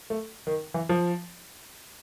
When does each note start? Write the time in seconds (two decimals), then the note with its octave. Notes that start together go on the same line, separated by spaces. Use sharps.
0.10 A3
0.47 D#3
0.74 E3
0.89 F3